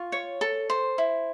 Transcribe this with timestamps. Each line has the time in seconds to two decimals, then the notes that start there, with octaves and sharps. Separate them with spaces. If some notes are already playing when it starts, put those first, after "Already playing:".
Already playing: F4 C#6
0.12 C#5
0.41 A4
0.70 C5
0.98 E4